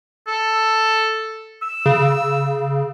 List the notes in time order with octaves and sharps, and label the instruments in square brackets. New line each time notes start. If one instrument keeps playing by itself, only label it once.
[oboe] A4
E6
[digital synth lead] C#3